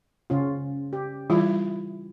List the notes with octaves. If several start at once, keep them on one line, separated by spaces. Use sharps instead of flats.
C#3 C#4 F4
G4
E3 G3 E4 F4